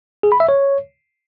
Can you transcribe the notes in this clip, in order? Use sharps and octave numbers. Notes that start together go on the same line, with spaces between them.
G#4
B5
E5
C#5